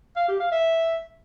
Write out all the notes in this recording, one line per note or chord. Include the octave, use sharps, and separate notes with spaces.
F5
G4
F5
E5